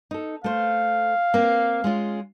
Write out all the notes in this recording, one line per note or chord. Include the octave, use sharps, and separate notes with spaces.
D#4 A4
A3 C5 F5
A#3 C4
G#3 C#4 F4